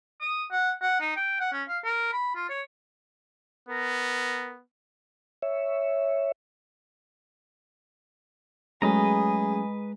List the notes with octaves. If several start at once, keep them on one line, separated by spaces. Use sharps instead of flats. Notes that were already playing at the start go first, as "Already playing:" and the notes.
D#6
F#5
F#5
D#4
G5
F#5
C#4
F5
A#4
B5
F4
C#5
B3 A#4
C#5 E5
F#3 G#3 A3 C#4 G#4 B4 D#5 A#5